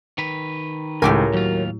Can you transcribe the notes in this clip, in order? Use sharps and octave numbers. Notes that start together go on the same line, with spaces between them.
D#3 B4
C#2 A2 G4 A#4 C#5 G#5
D#2 F#3 F4